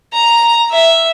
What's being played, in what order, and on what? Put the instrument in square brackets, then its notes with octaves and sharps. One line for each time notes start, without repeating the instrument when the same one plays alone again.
[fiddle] A#5
E5